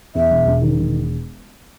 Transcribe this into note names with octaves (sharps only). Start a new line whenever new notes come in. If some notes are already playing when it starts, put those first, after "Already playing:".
E2 E5
E1
E1
D#3
E1